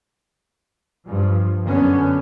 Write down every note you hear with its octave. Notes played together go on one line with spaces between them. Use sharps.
G2 F3
F#2 D3 B3 C#4